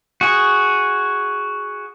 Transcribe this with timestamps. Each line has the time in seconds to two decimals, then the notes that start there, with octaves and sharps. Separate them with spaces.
0.21 F#4 G#4